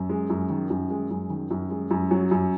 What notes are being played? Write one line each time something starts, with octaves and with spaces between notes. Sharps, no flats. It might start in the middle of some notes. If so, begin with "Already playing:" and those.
Already playing: F#2
G#3
F#2
D#3
F#2
G#3
F#2
D#3
F#2
G#3
F#2
F#3
F#2